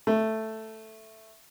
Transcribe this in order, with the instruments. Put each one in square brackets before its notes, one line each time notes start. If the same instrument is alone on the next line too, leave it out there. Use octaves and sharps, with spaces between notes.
[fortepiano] A3